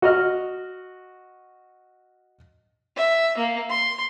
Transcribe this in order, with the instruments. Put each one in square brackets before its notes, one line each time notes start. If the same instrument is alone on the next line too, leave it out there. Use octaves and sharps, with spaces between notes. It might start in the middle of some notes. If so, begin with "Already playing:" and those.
[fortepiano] F#4 D#5 F6
[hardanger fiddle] E5
A#3
C6